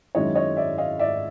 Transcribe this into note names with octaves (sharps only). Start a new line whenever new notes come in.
F#2 D#3 G#3 C#4 E4 C#5 D#5
C#5 D#5
D5 E5
D#5 F5
D5 E5